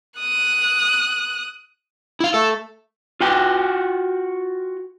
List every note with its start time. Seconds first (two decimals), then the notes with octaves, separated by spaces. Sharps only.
0.19 D#6 F#6
2.20 E4 F5
2.34 A3 A4
3.21 F4 F#4 G5